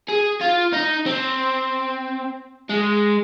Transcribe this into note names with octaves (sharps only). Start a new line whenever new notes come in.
G#4
F4
D#4
C4
G#3